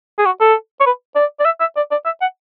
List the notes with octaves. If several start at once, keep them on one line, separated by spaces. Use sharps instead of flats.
G#4
F#4
A4
C#5
B4
D5
D5
E5
E5
D5
D5
E5
F#5